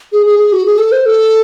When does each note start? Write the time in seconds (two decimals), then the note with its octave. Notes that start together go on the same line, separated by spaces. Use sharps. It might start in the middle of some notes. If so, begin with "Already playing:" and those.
0.13 G#4
0.26 G#4
0.39 G#4
0.52 F#4
0.66 G#4
0.78 A4
0.92 C5
1.06 A4